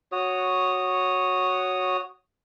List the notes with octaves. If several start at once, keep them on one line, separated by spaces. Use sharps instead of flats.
F#4 C#5 D#6